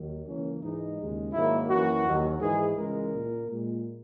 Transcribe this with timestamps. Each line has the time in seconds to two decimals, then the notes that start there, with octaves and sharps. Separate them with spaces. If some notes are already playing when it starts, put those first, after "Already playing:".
Already playing: D#2 D#3 F#3
0.26 C#2 C#3 E3 A#3 C#4
0.62 G#2 E3 G#3 D#4
0.98 D#2 C#3 G#3
1.33 G#2 D#3 F#3 A#3 E4
1.70 F#2 E3 A#3 F#4
2.05 D#2 D#3 F#3
2.41 G#2 E3 G#3 G#4
2.77 C#2 C#3 E3 G#3 A#4
3.13 A#2 A#3
3.49 A#2 G#3